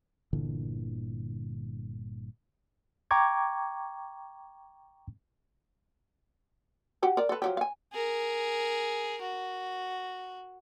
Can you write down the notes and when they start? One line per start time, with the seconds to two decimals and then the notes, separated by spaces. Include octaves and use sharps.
0.33 G1 A#2 D3 E3
3.11 G5 A#5 C#6 D6 G#6
7.03 F#4 G4 F#5
7.17 A#4 D5
7.29 A4 B4
7.42 F3 F#3 G4
7.57 F5 G#5
7.93 G#4 A#4
9.22 F#4